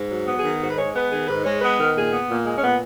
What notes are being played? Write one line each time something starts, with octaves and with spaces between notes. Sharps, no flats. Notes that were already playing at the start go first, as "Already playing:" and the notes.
Already playing: G#2
F#3
B3
G#4
D#3
G#2 F#4
B4
G#3 C#5
B3 B4
D#3 G#4
G#2 B4
G#3 C#5
B3 B4
D#3 A#4
A#2 G#4
B3
A#2
G#3
C#4
A#2 B3